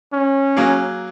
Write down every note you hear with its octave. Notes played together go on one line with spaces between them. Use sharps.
C#4
F#3 A#3 G#4